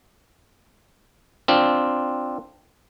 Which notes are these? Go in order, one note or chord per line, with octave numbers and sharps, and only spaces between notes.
C4 D4 F4